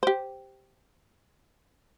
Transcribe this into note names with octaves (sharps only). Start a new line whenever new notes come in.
G4 C5